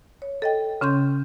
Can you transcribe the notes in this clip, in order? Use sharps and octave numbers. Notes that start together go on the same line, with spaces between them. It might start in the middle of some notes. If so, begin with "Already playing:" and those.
C#5
A4 D#5 G5
C#3 C#4 C6 G6